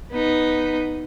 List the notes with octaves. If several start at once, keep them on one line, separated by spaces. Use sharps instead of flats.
B3 D#4